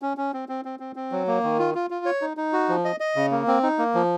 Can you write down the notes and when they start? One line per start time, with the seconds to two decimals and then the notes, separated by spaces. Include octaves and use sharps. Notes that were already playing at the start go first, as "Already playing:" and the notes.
0.02 C#4
0.17 C#4
0.33 C4
0.49 C4
0.65 C4
0.80 C4
0.96 C4
1.12 F#3
1.27 A#3
1.43 D#3
1.59 F4
1.75 F4
1.90 F4
2.05 C#5
2.22 D#4
2.37 D#4
2.53 F#4
2.69 F3
2.85 D#5
3.00 D#5
3.16 C#3
3.31 A#3
3.48 C4
3.63 D#4
3.79 A#3
3.95 F3